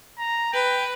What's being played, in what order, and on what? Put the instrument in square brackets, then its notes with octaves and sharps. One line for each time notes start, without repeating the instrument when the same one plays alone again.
[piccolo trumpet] A#5
[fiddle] B4 [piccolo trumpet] G5